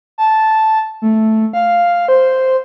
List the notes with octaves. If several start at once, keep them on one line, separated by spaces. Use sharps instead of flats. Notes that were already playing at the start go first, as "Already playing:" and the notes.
A5
A3
F5
C5